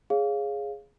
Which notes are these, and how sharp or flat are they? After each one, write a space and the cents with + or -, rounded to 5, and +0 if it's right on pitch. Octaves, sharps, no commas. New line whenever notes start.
G#4 +0 C#5 +0 F5 +0